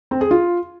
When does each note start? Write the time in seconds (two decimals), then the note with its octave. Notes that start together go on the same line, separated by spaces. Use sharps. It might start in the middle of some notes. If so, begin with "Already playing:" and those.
0.11 C4
0.21 G#4
0.31 F4